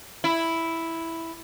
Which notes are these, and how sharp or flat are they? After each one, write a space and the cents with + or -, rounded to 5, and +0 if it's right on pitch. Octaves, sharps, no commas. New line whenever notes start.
E4 +0